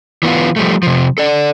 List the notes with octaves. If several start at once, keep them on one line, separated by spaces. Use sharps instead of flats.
E3 B3 F4
F3 G3 A3
C3 F3
A4 D5